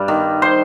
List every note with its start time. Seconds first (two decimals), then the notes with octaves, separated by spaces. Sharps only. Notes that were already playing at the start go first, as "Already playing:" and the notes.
Already playing: G2 G3
0.08 D#3
0.42 C5